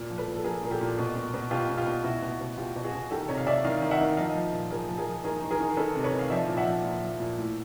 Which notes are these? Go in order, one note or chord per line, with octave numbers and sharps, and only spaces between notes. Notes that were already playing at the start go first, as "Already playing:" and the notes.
Already playing: A#2
F3
A4 B4
A#2
A4
F3 G#4 A#4
A#2 A#4
G4 A4
A#2
B2
B2
B2
B2 F4 G4
B2
F4 G4
B2
B2 E4 F#4
B2
B2
B2 F4 G4
B2
F#4 G#4
B2
D#3 G4 A4
C3 C#5 D#5
F5
C3 D5 E5
D#3 D#5 F5
D#3
E5 F#5
D#3
F3 D#5 F5
F3
A#2
F3 G#4 A#4
F3
G#4 A#4
F3
D#3 G#4 A#4
D#3
G#4 A#4
D#3
D#3 A4 B4
C3
B4 C#5
D#3
F5
F3 D5 E5
A#2
E5 F#5
F3
A#2
F3
A#2
A2